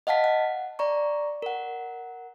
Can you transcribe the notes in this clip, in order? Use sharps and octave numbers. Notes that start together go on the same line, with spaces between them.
D#5 F5 F#5 A5 B6
F#5
D5 A#5 C#6
A#4 F#5